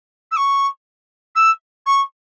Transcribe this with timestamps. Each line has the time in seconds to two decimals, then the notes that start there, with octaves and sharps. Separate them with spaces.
0.32 E6
0.37 C#6
1.36 E6
1.86 C#6